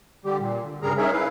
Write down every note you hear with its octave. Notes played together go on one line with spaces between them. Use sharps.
D3 G3 G4
A#2
D3
G2 C#3 G3 G#4 A#4 A#5
C#4 D#4 G#4 A#4 C#5 E5
E4 B4 F5